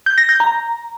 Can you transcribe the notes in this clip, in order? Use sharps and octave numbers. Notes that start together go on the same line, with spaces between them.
G6
A#6
G6
A#5